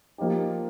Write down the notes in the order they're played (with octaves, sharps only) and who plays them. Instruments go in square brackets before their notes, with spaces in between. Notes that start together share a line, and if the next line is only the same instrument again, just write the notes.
[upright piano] F3 A#3 D#4 G4